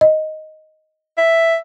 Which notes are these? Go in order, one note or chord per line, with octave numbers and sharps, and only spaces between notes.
D#5
E5